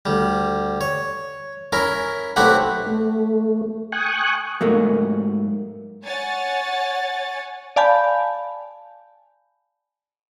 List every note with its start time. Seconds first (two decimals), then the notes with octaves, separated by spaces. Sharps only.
0.06 D2 G3
0.81 C#5
1.72 C#4 E4 A#4
2.36 B1 A3 C4 E4 G4 F#5
2.86 A3
3.92 G5 G#5 C#6 D#6 F#6
4.61 G#2 F#3 A3 A#3
6.06 C#5 F#5 G#5 A6
7.76 D5 F5 G#5 A5 B5 G6